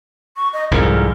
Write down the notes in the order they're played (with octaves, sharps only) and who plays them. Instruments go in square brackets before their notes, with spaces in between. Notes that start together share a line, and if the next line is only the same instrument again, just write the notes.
[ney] C#6
D#5
[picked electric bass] C2 F2 G#2 [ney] A#4